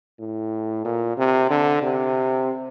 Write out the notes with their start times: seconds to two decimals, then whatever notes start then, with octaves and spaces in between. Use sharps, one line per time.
0.20 A2
0.85 A#2
1.17 C3
1.50 D3
1.82 C3